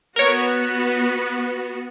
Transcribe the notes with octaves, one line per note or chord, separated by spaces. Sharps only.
B3 F#4 A#4 C#5